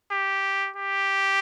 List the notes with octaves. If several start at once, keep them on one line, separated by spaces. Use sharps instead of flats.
G4
G4